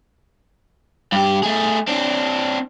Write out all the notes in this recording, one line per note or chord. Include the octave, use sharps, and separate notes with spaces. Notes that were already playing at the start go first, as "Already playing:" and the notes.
G2 G4
A3 G#4
C4 D4